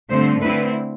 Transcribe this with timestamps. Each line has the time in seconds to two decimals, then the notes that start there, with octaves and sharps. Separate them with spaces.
0.10 G2 D3 A3 C4 C5
0.41 D3 A3 C4 E4 B4